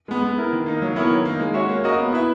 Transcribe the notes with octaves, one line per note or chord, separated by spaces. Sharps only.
G#3 B3
B3
E4 A#4
D#3
A#3 D#4
F#3
B3 E4 A#4 C#5
D#3
A#3 D#4
G#3
C#4 F#4 C#5 E5
A#3
C#4 F#4 A#4 D#5
B3
E4 B4 E5